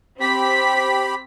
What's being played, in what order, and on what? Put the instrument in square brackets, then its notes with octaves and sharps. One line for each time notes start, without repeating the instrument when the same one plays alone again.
[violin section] C4 B6 [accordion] G4 B5